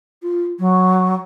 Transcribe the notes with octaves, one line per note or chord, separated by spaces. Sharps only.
F4
F#3